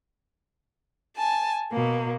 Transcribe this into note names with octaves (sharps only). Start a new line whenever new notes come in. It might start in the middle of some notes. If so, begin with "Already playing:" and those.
G#5 A5
B2 A#3